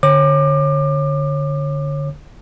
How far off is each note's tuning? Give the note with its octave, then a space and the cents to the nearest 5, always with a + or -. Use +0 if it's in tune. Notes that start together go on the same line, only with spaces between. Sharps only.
D3 +0 C#5 -25 D6 +30